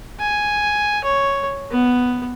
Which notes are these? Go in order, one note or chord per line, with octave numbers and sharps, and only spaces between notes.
G#5
C#5
B3